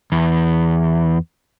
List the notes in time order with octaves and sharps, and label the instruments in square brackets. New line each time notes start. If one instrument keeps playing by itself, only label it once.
[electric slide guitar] E2